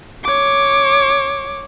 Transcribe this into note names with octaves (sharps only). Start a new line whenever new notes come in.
C#5 D6